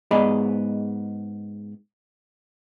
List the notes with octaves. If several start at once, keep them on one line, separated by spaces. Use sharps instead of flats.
G#2 B3 G#4 D5 D#5 B5